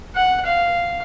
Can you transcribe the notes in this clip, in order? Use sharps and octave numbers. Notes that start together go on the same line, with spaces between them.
F#5
F5